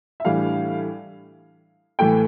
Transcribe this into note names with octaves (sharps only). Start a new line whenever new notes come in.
E5
A2 E3 G3 D4 F5
A2 E3 A3 G5